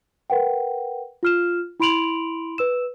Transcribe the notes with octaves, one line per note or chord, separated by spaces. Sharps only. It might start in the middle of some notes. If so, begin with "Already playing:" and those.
A#4 B4 F#5 G5
F4 F6 E7
E4 B5 C6 D7 F7 F#7
B4 E6 E7